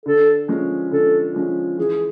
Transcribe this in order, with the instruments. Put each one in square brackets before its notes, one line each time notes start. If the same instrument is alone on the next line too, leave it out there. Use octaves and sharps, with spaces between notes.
[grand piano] D3 [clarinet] A4
[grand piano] F3 G#3 C#4
[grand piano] D3 [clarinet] A4
[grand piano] F3 G#3 C#4
[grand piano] E3 [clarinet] G#4